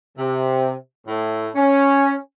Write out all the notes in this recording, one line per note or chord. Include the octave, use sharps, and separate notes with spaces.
C3
A2
C#4